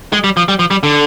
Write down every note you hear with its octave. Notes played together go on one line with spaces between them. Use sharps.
G#3
G3
F3
G3
F3
G3
D3